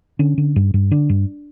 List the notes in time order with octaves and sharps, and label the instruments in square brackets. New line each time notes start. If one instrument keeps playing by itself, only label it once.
[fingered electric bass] D3 C#4
D3
G2
G2
D3 D4
G2